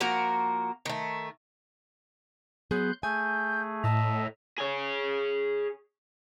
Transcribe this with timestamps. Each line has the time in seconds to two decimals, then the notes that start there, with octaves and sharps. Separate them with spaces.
0.01 F3 A#3 F#4 A#4
0.86 D#3 A3
2.71 F#3 B3 G#4 C6 F#6 G6
3.03 A3 G#4 G#5 G6
3.84 A2 D#5 E5 A5 A#5
4.59 G#4 C#5